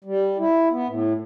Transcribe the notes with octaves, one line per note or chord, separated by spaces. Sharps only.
G3
E4
B3
A2